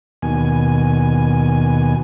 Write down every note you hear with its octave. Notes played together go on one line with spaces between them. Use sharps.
D#2 B2 G#5